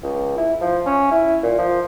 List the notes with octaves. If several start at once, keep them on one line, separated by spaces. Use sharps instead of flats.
C#2
E4
F3
C#4
E4
A#2
F3